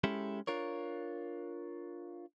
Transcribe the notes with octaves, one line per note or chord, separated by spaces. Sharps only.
G#3 C#4 E4 G4 A4
D4 F4 A#4 C#5